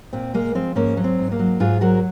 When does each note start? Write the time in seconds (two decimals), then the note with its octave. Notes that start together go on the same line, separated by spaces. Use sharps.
0.13 A#2 C4
0.34 G#3 A#3
0.55 F3 C4
0.75 G#2 A#3 C#4
0.97 F#3
1.04 C4
1.19 G#2
1.32 A#3
1.39 F#3
1.60 G#2 F4 G#4
1.81 F#3 F#4 A#4